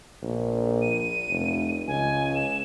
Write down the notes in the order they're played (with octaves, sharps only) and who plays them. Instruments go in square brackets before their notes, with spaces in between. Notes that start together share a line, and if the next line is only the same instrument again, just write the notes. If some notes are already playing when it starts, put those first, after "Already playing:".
[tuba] A#1
[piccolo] D#7
[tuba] F1
[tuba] C#2 [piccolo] G#5
[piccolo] E7